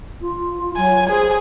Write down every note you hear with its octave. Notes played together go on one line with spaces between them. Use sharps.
F4
F#3 G#5
G#4 C5